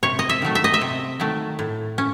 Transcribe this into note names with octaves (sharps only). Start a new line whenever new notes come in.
C3 C#5
D#5
E5
D#3 F#3 A3
E5
D#5
E5
C3
D#3 F#3 A3
A2
C#4